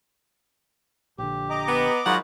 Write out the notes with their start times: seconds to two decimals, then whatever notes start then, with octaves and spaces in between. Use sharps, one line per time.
1.18 A#1 D3 G4
1.50 D#5 A#5 D6
1.68 B3
2.06 G#2 D#3 F#3 F4 C#5 F#5 B5